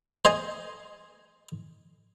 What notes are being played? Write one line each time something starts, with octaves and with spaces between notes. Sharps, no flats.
C5 D#5 G#5 A5